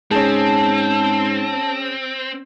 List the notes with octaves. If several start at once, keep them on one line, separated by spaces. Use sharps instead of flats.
G#2 C4 C#4 G#4 A5